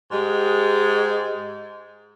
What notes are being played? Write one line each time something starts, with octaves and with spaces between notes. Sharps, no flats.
G#2 G#3 G4